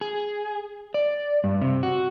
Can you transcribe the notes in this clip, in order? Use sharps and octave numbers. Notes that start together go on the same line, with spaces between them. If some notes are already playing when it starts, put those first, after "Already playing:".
G#4
D5
G2
C3
F#4